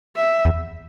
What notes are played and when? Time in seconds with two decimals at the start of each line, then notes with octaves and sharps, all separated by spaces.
0.16 E5
0.45 E2